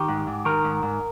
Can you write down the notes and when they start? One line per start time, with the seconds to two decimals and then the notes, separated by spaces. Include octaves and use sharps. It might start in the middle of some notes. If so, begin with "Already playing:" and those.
Already playing: D#3 G4
0.09 G#2
0.27 G#2
0.45 D#3 A#4
0.64 G#2
0.83 G#2